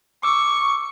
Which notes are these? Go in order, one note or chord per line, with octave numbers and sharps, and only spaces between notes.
C#6 D6 E6